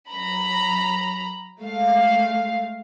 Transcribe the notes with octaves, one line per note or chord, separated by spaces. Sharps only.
F#3 A#5 B5
G#3 A3 F5